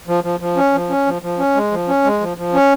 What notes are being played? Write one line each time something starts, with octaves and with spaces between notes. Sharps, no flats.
F3
F3
F3
C#4
F3
C#4
F3
F3
C#4
G#3
F3
C#4
G#3
F3
F3
C#4